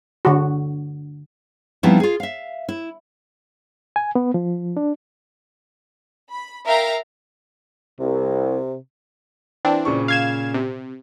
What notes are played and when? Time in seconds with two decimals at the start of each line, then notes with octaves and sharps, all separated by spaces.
0.25 D3 F#4
1.83 F3 G3 B3 C4 D#4 E4
2.00 F4 G#4
2.20 E5 F5
2.69 E4
3.96 G#5
4.15 B3
4.34 F3
4.77 D4
6.30 B5
6.65 A#4 E5 F5 G5 A#5
7.99 C2 C3
9.65 E3 C4 D4
9.85 A#2 C#3 C#6
10.08 F5 G#6 E7
10.54 C3